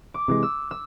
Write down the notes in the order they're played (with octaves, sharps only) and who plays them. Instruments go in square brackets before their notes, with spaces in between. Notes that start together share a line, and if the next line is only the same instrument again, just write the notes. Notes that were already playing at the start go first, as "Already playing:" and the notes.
[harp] D6
[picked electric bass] C3 E3 G#3
[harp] E6
E6